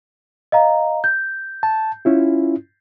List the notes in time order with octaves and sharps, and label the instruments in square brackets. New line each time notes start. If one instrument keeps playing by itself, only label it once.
[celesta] D#5 F5 A#5
G6
[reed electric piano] A5
C#4 E4 F4